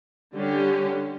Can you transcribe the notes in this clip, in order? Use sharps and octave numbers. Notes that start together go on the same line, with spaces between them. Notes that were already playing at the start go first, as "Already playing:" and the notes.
D3 G3 C#4 G4